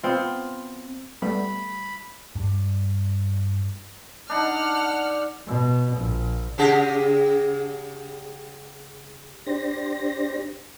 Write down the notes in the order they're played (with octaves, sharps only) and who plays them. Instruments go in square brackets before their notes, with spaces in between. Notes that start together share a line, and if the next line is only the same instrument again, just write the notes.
[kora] B3 C4 F4
[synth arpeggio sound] G3 A3 B3 [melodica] B5
[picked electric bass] G2 G3
[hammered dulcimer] D4 D#4 [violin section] F#5 F6
[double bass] B2
A#1
[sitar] C#3 G4 G#4
[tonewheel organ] D4 G4 C5 A#6